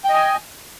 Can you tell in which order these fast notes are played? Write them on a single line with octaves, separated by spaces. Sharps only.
G5 D#5 G#5